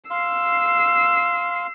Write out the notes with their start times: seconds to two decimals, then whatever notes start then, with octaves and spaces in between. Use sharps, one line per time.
0.11 F5 C6 E6 C7